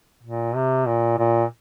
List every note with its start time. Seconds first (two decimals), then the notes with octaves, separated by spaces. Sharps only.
0.23 A#2
0.55 C3
0.87 A#2
1.18 A#2